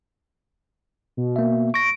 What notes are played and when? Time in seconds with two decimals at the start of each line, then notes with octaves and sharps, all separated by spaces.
1.17 B2
1.36 A#3 E5
1.74 C#6 A#6 D7